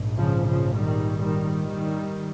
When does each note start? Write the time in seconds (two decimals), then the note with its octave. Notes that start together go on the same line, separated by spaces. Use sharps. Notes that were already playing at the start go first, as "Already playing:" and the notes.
Already playing: A#1 G#2
0.18 C#3 F3
0.46 C#3 F3
0.76 D#3 G3
1.19 D#3 G3
1.63 D#3 G3